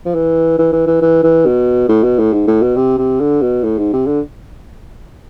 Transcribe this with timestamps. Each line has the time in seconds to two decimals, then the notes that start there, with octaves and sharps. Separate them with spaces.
0.05 F3
0.14 E3
0.58 E3
0.72 E3
0.87 E3
1.01 E3
1.23 E3
1.46 B2
1.89 A2
2.03 B2
2.18 A2
2.33 G#2
2.47 A2
2.62 B2
2.76 C3
2.97 C3
3.20 D3
3.42 B2
3.64 A2
3.78 G#2
3.93 C3
4.07 D3